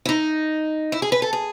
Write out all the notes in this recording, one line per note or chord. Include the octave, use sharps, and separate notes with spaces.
E4
D#4
E4
G#4
B4
A4
G#4